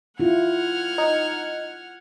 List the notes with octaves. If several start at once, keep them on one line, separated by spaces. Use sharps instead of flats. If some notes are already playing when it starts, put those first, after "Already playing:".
E4 F4 F#5 F6 G#6
D#4